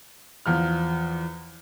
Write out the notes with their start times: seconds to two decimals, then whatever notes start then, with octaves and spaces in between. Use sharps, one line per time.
0.46 E2 F3 F6